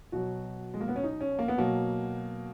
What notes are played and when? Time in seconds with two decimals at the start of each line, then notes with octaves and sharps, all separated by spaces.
0.12 B2 F#3 F#4
0.74 G#3
0.81 A#3
0.88 B3
0.96 C#4
1.03 D#4
1.21 C#4
1.39 A#3
1.48 B3
1.58 B2 F#3 A#3